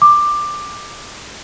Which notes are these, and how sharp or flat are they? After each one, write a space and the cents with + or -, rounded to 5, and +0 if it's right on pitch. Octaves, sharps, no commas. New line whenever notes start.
D6 +15